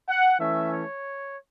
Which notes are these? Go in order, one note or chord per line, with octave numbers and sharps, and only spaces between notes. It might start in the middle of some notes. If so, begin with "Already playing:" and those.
F#5
E3 A3 C#4 E5
C#5